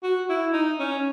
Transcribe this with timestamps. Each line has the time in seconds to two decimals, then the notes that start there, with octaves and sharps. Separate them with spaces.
0.03 F#4
0.29 E4
0.53 D#4
0.80 C#4